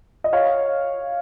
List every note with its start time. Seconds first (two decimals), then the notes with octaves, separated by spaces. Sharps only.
0.24 D#5
0.33 C#5 F5